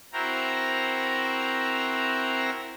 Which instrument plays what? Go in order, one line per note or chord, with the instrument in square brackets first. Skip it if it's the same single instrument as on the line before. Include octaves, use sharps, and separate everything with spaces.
[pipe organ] C4 E4 F#4 A#4 C5 A#5